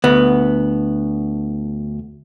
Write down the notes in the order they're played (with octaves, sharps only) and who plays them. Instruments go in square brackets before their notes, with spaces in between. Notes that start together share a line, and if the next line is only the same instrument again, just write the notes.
[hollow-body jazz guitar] D2 B3